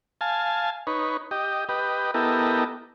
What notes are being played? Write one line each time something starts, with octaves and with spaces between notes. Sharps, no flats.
F5 G#5 A5
D#4 B4 C#5
G4 D#5
G4 B4 D#5
B3 E4 G4 A4 A#4 D#5